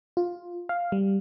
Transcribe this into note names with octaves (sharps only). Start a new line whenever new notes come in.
F4
F5
G3